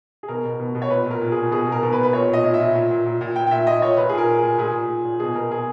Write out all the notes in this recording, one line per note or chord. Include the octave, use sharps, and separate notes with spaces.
G#4
B2 A#4
B2
B2
B2
C#5
A#2 B4
A#2 A#4
A#2
A#2 G#4
B2 G#4
B2
A#4
B2
B4
B2
B4
A#2 C#5
A#2 D#5
A#2
E5
A#2
A#2
A#2
A#2
A#2
A#2 G5
G5
A#2 E5
A#2 D#5
A#2 C#5
A#2 B4
G#4
A#2 A#4
A#2
A#2 G#4
A#2 G#4
A#2
A#2
A#2
B2 G#4
B2 A#4
B2 G#4